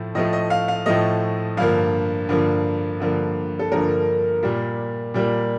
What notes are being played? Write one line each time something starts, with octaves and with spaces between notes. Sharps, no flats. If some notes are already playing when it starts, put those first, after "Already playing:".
Already playing: A2 F3 A3
A2 F3 A3 D#5
D#5
F5
F5
A2 F3 A3 D#5
G2 D3 F3 A#3 F5
G2 D3 F3 A#3
G2 D3 F3 A#3
A4
G2 D3 F3 A#3 A#4
A#2 G3 A#3
A#2 G3 A#3